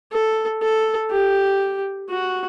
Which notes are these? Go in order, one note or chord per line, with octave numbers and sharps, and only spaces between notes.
A4
A4
G4
F#4